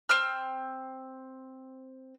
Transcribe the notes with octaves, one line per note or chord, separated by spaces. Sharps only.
C4 E6 F6